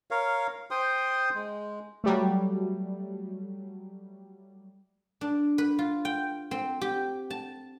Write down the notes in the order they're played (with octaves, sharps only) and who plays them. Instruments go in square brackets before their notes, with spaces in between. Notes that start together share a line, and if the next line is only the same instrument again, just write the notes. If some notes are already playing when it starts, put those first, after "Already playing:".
[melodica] A#4 C#5 F5
C5 G5 C6 D#6
G#3
[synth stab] F#3 G3 A3
[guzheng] D4
B4
F4
G5
C4
G4
A5